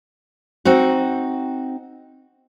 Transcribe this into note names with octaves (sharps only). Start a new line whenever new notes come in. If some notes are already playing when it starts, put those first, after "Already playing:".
C4 D#4 F#4